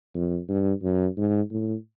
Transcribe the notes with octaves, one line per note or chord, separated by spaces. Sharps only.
F2
G2
F#2
G#2
A2